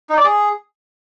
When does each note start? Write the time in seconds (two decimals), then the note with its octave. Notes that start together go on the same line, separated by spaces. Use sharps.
0.10 D#4
0.17 D5
0.24 G#4